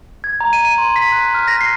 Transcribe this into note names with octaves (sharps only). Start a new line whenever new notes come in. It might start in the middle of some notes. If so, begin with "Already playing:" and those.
G#6
A#5
D#7
D#7
C6
B6
F#6
F6
A#6
C7